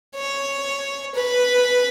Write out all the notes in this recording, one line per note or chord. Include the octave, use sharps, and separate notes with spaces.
C#5
B4